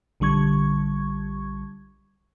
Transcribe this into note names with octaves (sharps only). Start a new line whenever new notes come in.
A#1 D3 G3 C#6 G#6